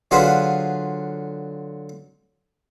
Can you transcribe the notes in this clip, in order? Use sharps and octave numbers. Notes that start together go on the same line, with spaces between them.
D3 F#3 F4 G#4 B4 C5